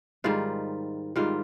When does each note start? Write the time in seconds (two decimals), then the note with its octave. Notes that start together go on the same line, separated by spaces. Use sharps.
0.24 G#2 D#3 G3 F4
1.16 G#2 D#3 G3 F4